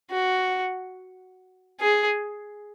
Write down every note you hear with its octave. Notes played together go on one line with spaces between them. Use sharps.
F#4
G#4